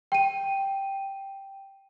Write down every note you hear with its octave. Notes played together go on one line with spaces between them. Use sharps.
G5 D#7